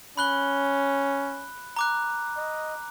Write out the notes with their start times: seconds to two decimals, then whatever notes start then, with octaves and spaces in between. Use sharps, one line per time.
0.17 C#4 B5 F#6 G7
1.76 A#5 D6 F#6
2.37 D#5